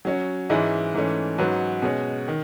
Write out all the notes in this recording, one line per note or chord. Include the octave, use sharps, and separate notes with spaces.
F#3 C#4 F#4
G#2 E3 G#3 C#4 E4
G#2 E3 A3 C#4
G#2 F#3 C#4 F#4 B4
B2 G#3 C#4
D#3